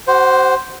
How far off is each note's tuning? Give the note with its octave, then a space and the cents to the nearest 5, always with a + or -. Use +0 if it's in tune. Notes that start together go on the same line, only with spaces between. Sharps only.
F#4 +40 C5 +0 F#5 +0